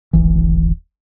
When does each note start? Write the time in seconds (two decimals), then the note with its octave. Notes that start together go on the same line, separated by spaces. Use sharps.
0.13 D1 G#1 E3